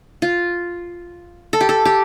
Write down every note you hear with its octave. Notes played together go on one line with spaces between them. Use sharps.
F4
A4
G4
A4
G4